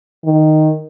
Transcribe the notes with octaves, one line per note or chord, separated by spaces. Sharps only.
D#3